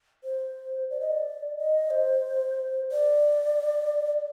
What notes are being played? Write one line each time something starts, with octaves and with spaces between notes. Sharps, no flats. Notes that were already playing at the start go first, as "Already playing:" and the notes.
C5
D5
D#5
D5
D#5
C5
D5